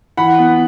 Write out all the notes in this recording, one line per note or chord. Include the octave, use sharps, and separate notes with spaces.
E3 F#5 B5
B3